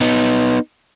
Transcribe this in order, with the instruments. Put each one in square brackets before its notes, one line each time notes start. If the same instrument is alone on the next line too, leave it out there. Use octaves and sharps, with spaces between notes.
[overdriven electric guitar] B3 D#4